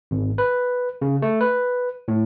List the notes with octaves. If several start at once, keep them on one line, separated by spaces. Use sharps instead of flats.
G#1
B4
C#3
A3
B4
A2